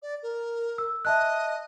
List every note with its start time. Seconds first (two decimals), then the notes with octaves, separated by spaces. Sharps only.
0.02 D5
0.23 A#4
0.78 E6
1.05 D#5 E5 A5 F#6